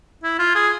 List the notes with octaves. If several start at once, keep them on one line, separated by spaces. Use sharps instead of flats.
E4
F4
G#4